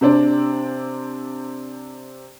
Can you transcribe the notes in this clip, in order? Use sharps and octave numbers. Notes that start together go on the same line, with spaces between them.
C3 C4 D4